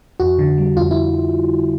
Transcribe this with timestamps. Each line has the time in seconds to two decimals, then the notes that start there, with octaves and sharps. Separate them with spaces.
0.20 F2 F#4
0.39 D3
0.58 G3
0.77 F2 F4
0.91 E4